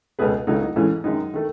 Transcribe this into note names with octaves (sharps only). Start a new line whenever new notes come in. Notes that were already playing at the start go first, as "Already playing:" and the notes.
C#2 B2 A3 G#4 B4
C#2 C#3 F#3 A3 D#4
D#4
G#2 E3 A3 C#4
F#2 D#3 G#3 D#4
D#3 A3